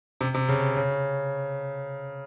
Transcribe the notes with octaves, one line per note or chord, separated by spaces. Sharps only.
C3
C3
C#3
C#3